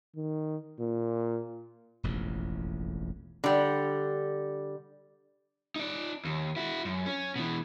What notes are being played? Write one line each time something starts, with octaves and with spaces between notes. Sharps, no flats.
D#3
A#2
E1 A1 F2
D3 G3
D#4 D5
D#2
E4 F#4
F#2
C#4
B2 E3